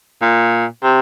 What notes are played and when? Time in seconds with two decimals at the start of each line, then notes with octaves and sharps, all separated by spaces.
0.22 A#2
0.84 C3